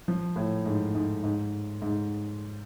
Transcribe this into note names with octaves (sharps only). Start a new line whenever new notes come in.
F3
A2
G#2
G#2
G#2
G#2